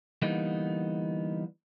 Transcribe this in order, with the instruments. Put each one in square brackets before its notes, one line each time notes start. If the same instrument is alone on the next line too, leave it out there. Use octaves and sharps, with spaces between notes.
[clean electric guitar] D3 E3 G3 A#3 B3 D#4